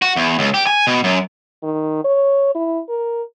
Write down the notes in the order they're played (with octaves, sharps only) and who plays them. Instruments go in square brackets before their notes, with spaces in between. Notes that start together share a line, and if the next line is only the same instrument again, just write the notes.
[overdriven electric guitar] F#4
E2
C#2
G4
G#5
B2
F#2
[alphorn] D#3
C#5
E4
A#4